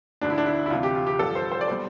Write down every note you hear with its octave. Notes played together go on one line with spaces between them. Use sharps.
E1 D2 D3 D4
E4
D4
E4
E4
D2 C3 E3 F4
G4
F4
G4
A1 G2 F3 A4
C5
C5
D5
B2 G3 C5